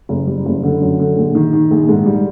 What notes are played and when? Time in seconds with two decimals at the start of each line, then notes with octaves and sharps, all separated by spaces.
0.09 F#1
0.27 G3
0.46 F#1
0.63 D3
0.81 F#2
1.00 D3
1.17 A#1
1.35 D#3
1.53 D#3
1.71 A#1
1.89 G#2
2.06 G3